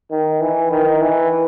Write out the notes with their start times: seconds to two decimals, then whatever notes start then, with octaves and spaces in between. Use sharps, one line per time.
0.11 D#3
0.41 E3
0.71 D#3
1.01 E3